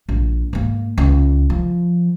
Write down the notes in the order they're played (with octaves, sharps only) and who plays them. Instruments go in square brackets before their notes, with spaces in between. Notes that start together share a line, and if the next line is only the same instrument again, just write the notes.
[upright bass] A#1
G#2 A#3
C#2
F3